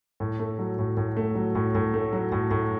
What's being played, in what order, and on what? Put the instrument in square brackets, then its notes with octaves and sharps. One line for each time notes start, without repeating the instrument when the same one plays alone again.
[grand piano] A2
A3
F#3
A2
A2
A3
F#3
A2
A2
A3
F#3
A2
A2